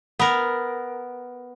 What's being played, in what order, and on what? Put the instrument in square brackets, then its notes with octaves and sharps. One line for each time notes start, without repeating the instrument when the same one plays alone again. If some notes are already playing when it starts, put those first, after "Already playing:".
[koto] B3 A#4